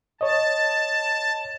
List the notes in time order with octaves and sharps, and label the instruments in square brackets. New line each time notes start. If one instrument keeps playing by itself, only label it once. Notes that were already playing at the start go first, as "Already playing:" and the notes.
[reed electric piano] C#5 D#5 [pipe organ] A5